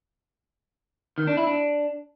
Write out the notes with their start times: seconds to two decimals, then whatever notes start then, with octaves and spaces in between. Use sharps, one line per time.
1.18 D#3
1.27 D4
1.37 E4
1.47 D4